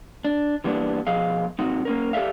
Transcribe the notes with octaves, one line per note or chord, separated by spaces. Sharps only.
D4
E3 G3 A#3 B3 D4
B2 F3 G#4 D#5 F5
G2 A#2 C4 D#4 F#4
A#3 C#4 A#4
G4 A4 A#4 D5 E5 F5